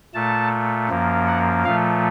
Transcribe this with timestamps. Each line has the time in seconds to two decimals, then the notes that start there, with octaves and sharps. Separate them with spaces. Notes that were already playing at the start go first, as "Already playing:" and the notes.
0.14 A#2 A3 A5
0.89 F#2 F3 A#3
1.27 F#5
1.65 A#2 F3 A3 F5